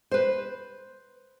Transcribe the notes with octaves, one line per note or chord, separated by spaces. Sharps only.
B4 C5